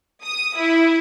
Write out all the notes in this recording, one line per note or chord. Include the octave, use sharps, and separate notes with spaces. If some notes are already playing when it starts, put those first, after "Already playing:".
D#6
E4